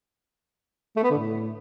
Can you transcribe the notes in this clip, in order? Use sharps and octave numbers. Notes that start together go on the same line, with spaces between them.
A3
B3
D3
A2